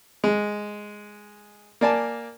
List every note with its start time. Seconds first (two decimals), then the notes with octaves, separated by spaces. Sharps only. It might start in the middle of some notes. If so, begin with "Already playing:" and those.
0.24 G#3
1.81 A#3 D5 G#5 A5